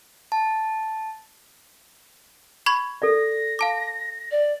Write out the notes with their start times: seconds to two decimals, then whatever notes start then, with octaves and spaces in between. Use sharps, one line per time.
0.32 A5
2.66 B5 C#6 G#6
3.02 A4 D5 A#6
3.59 F5 A5 D6
4.31 D5